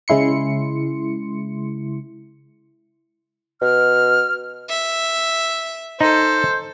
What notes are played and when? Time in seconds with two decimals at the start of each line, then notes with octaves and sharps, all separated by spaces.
0.08 C#3 G#3 E4 C6 C#7
3.61 B2 F6
4.69 E5
6.01 D#4 A4 C5